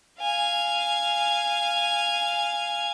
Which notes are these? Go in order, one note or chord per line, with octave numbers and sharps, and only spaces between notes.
F5 G#5